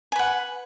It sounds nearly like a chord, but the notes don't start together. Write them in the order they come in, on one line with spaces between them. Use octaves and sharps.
G#5 B4 F#5